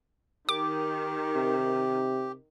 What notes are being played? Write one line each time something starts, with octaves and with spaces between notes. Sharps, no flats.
D#3 G4 D6
C3